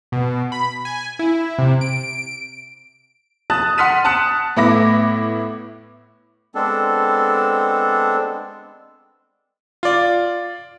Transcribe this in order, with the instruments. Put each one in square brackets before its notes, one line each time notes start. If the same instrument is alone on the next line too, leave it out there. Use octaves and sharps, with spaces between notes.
[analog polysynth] B2
B5
G#5
E4
C3
D7
[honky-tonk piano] A5 D#6 F#6 A6
F#5 C6 F6 B6 D#7
A5 D#6 F#6 C#7 E7
A2 B3 E4 B5 D6 A#6
[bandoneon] G#3 B3 C4 D4 A4
[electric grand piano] F4 D5